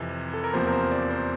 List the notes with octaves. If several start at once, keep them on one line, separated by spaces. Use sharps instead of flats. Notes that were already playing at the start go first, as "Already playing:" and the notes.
Already playing: F2 C3 E3
A4
A#4
E2 C3 F3 A#3 C5
A#4
C5
D5
C5